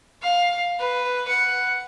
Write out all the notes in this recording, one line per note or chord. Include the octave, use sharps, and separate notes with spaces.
F5
B4
F#5